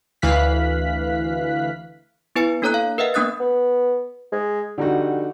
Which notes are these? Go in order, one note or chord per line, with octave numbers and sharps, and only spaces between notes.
D2 E3 F5 F#6 B6
B3 E4 B4 G#5 C#7
A#3 D4 A4 C#5 A#5 F#6
F5
A#4 B4 D#5 E5 F#5
A#3 B3 D4 D#6 F#6 A6
B3
G#3
D3 G3 D#4 F#4